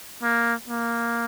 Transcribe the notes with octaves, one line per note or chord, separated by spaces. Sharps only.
A#3
A#3